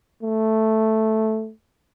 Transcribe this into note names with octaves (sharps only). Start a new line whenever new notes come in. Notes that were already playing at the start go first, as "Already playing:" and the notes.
A3